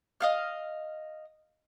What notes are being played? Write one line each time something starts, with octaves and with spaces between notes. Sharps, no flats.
D#5 F5 F6